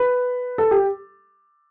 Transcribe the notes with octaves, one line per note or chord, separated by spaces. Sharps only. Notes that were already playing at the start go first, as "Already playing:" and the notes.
Already playing: B4
A4
G4